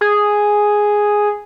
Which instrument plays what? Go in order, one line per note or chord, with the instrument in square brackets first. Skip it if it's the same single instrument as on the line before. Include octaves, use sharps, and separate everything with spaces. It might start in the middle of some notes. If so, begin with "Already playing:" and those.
[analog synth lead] G#4